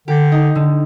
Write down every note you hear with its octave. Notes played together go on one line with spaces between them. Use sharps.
D3 G4
D#4
D3